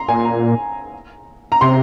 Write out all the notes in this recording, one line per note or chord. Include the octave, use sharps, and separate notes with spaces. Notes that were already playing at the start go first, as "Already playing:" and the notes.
Already playing: A#5 C6
A#2 G#5
A#5
A#5
C3 C6